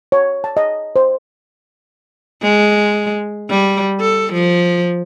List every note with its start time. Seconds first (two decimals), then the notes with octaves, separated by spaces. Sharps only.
0.12 C#5
0.44 A5
0.57 D#5
0.96 C5
2.42 G#3
3.50 G3
4.00 A4
4.33 F3